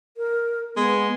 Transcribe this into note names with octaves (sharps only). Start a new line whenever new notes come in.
A#4
G#3 B3